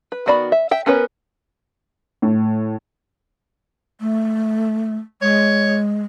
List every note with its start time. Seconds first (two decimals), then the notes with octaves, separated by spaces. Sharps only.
0.12 B4
0.26 D#3 B3 F#4 D5 B5
0.52 E5
0.71 E5 G5
0.86 B3 C#4 A#4 B4 C#5
2.22 A2
4.01 A3
5.22 G#3 C#5